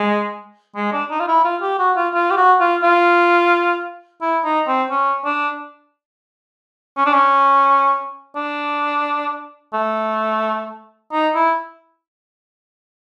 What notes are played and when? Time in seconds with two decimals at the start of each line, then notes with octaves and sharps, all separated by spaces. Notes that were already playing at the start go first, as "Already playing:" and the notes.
Already playing: G#3
0.76 G#3
0.93 D4
1.11 D#4
1.20 F4
1.28 E4
1.45 F4
1.62 G4
1.79 F#4
1.97 F4
2.14 F4
2.31 G4
2.37 F#4
2.60 F4
2.83 F4
4.22 E4
4.45 D#4
4.67 C4
4.90 C#4
5.25 D4
6.98 C#4
7.06 D4
7.14 C#4
8.36 D4
9.74 A3
11.12 D#4
11.35 E4